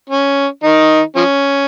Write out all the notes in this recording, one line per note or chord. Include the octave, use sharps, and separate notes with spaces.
C#4
D#3 D#4
F3 C#4